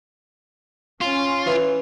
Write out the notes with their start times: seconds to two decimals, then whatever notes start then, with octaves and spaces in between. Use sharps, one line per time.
1.01 C#4 F4
1.46 E3